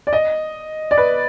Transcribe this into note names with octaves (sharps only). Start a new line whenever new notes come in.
D5
D#5
D5
B4